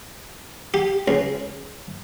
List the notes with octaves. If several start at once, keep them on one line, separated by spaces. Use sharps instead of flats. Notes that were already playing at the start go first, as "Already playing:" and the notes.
G4
C#2